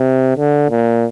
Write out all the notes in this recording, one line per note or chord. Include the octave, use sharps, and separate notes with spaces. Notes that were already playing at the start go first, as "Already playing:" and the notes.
Already playing: C3
D3
A#2